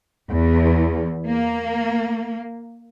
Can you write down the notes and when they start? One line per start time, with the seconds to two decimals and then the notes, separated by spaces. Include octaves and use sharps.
0.28 E2
1.27 A#3